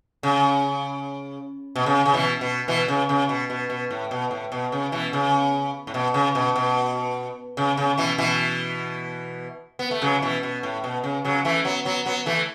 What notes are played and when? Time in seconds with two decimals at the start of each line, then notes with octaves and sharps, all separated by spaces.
0.23 C#3
1.75 B2
1.86 C#3
2.05 C#3
2.14 B2 E3
2.41 B2
2.68 B2 E3
2.88 C#3
3.09 C#3
3.29 B2
3.50 B2
3.70 B2
3.90 A2
4.11 B2
4.31 A2
4.52 B2
4.72 C#3
4.92 B2 E3
5.13 C#3
5.87 A2
5.94 B2
6.14 C#3
6.35 B2
6.56 B2
7.57 C#3
7.77 C#3
7.98 B2 E3
8.18 B2 E3
9.79 B3
9.91 A3
10.02 C#3 F#3
10.22 B2 E3
10.43 B2
10.63 A2
10.84 B2
11.04 C#3
11.24 C#3 F#3
11.45 E3 A3
11.65 F#3 B3
11.85 F#3 B3
12.06 F#3 B3
12.26 E3 A3